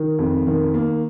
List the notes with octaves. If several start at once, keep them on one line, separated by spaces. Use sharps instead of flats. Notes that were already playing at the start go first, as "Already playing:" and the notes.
Already playing: D#3
F2
D#3
A#3